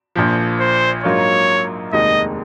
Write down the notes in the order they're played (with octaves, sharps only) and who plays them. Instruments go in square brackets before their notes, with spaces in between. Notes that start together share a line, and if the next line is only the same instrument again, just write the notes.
[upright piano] A#1 A#2 F3
[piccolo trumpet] C5
[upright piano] A#1 G#2 F#3 A#3 F4 [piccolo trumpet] C#5
[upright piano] F1 D#2 D#3 G#3 D#4 [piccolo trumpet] D#5